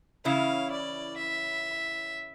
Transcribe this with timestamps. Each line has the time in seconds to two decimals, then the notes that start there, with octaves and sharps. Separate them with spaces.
0.25 C#3 E3 C#4 E4 F5
0.71 D5
1.17 E5